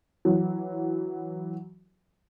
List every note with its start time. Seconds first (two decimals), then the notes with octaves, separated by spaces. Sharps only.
0.25 E3 F#3